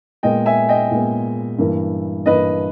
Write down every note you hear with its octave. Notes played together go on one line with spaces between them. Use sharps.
A#2 G#3 B3 D#5 G5
E5 G#5
D#5 G5
A#2 G#3 B3
G2 E3 A#3
G2 E3 A#3 B4 D#5